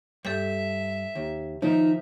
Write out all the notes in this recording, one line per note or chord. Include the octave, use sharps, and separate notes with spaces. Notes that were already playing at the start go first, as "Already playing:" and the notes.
G2 A4 E5 G6
D#2
D#3 F3 D#4 E5